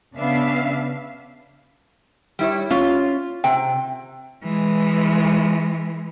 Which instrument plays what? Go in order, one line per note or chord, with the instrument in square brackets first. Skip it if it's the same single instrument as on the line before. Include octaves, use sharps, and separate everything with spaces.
[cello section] C#3 B3 D4 E5 F5
[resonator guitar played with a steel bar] G3 E4 C#5
[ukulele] C#4 [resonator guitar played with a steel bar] F4
[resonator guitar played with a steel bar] C3 [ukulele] G5
[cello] E3 G#3